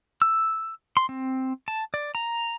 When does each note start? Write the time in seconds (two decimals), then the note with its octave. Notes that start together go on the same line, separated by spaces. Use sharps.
0.22 E6
0.97 C6
1.09 C4
1.68 A5
1.94 D5
2.15 A#5